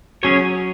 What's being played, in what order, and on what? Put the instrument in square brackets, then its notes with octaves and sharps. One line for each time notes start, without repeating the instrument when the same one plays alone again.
[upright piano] F#3 [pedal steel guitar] C#4 G#4 C#5